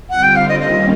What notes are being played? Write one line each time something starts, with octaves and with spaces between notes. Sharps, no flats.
D3 G3 C4 F4 F#5
G5
F5
D#5
D#3 G3 A#3 C#4 D#5